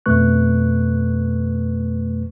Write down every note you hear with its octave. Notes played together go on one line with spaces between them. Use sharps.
F2 B2 A3 B4 C#6 F#6